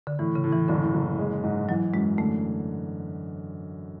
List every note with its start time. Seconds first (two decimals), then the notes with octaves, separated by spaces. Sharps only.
0.07 D3
0.19 A2 E3
0.35 C#3
0.44 A2
0.52 E3
0.69 F#1 D3
0.94 F#1
1.19 G#3
1.44 G#2
1.69 E3 F#3
1.94 F#2 G#3
2.18 D3 A3